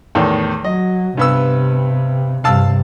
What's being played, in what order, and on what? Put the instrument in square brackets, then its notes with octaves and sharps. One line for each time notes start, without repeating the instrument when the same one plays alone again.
[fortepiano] E2 A2 D#3
[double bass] F#3 [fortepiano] D#5
[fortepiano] G2 B3 E6 [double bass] C3
[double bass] G2 C3 [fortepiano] F5 A5 E6